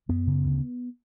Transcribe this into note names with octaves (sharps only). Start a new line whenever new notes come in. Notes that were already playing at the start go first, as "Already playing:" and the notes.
F#2 B3
C#3
D2